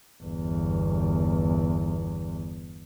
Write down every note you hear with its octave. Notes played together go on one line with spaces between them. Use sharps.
G1 E2